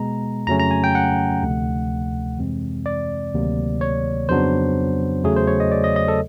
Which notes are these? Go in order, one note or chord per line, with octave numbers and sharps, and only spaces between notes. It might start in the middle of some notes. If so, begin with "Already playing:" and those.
Already playing: B2 G#3 B3 A#5
F2 C#3 F#3 A3 C#4 A#5
A#5
G#5
G5
F#5
D2 C3 F3 A3
F2 C3 E3 G#3 C4
D5
D2 C3 D#3 F#3 A#3
C#5
F2 C#3 F#3 B3 D4 C5
E2 C#3 F#3 A3 G#4
C5
C#5
D#5
D5
D#5
D#5
A4